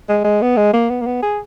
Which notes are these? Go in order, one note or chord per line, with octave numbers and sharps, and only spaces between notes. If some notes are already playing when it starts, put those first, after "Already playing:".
G#3
G#3
B3
G#3
A#3
B3
A#3
B3
G#4